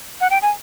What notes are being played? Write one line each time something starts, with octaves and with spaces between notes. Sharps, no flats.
F#5
G5
G#5